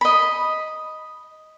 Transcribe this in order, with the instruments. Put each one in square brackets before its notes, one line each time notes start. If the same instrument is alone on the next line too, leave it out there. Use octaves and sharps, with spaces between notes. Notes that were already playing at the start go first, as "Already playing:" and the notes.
[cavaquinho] D#5 B5